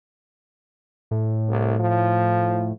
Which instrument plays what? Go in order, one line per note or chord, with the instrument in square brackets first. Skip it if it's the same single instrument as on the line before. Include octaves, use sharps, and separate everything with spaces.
[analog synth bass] A2
[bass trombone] C2
F3